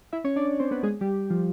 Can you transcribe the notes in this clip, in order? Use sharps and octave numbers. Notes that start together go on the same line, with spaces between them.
E4 E5
C#4 C#5
D4 D5
C4 C5
B3 B4
G#3 G#4
G3 G4
F3 F4